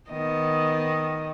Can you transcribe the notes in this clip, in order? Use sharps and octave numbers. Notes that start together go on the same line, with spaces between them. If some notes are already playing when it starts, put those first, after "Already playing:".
D#3 B3 D#5